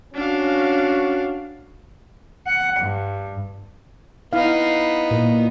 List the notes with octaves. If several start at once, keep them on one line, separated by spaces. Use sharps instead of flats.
C#4 D4 F#4 F5
F#5
G2
B3 D#4 E4 F5
A#2